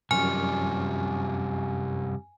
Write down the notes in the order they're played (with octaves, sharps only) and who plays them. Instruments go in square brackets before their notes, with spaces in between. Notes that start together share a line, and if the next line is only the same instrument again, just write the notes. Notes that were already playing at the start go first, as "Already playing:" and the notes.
[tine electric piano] F#2 C#6 F6 [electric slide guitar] C3 F3 G3 [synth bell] G#5